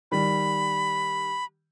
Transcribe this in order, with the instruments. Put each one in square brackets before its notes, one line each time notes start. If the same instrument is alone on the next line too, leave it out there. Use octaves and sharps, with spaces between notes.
[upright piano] D#3 G3 [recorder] B5